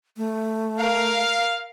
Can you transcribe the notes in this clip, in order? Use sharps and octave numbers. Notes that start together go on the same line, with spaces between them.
A3
A#4 F5